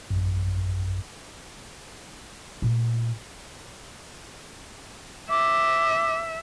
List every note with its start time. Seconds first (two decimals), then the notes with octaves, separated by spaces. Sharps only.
0.10 A1 F#2
2.62 A#2 A3
5.30 E5 D6